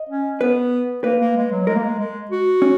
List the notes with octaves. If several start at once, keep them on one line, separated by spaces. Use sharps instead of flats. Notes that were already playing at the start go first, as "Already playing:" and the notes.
Already playing: D#5
C#4
B3 B4
A#3 B4
A#3
G#3
F#3
G#3 A#4
A#3
G#3
G#3
F#4
C#4